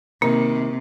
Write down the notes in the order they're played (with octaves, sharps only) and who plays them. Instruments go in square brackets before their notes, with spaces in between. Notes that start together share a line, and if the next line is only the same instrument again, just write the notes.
[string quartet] C3 [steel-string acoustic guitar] D#3 [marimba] A#3